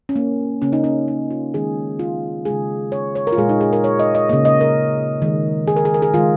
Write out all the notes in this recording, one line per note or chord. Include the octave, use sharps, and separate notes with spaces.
C#4
A#3
C#3 A#3 C#4
D#4
C#4
D#4
F4
D#3 G#3 G#4
F4
C#3 G#3 G#4
C#5
C#5
A#4
F4
A#2 G#3 G#4
D#4
G#4
A#4
C#5
D#5
D#5
C#3 A#3 D#5
D#5
A#4
D#3 G#3
G#4
A#4
G#4
A#4
G#4
D#3 G#3 F4